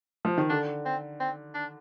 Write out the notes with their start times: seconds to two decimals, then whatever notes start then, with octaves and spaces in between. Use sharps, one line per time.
0.25 F3
0.38 D#3
0.49 D3 D4
0.85 C4
1.20 C4
1.54 D4